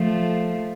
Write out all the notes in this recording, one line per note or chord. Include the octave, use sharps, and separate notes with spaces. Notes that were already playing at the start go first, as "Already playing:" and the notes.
Already playing: F3 A3